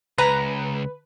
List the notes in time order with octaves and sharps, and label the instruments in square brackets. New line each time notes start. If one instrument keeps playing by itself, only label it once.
[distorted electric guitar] C#2 [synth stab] B4 [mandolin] A#5